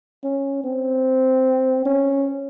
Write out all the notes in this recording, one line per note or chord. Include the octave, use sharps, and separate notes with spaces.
C#4
C4
C#4